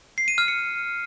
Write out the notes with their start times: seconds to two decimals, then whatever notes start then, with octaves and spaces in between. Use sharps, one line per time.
0.18 C7
0.28 D#7
0.38 F6
0.48 C#7